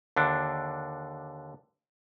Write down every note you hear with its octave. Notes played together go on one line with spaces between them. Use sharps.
D#2 D3 D4